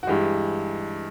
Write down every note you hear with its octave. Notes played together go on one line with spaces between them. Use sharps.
F#4
G2 E3 G#3 G4